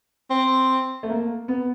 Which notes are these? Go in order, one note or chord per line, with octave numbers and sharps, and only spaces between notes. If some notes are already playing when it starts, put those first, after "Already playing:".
C4
A3
A#3
B3